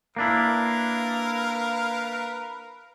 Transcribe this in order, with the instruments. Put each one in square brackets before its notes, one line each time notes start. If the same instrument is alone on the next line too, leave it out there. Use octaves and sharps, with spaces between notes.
[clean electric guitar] A#3 D4 E4 [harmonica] A#4 B4 F5